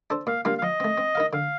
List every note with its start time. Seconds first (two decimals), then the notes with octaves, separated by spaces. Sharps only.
0.10 D4 A4 C5
0.27 A#2 F5
0.45 G3 A#3 D4 F4 F5
0.59 F5
0.62 F3 D#5
0.80 A3 C4
0.98 C4
1.15 D#4 A#4 F5
1.33 D3 F5